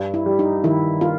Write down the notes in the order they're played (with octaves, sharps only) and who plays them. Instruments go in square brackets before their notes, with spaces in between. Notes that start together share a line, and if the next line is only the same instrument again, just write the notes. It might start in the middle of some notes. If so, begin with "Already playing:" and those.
Already playing: [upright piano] G2
[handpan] E4
[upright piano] G3
[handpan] D#4
[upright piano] D#3 [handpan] E4
[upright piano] A#3 [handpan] F4